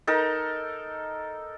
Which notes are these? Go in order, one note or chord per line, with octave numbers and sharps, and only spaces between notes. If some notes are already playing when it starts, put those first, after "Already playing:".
D#4 A4 A#4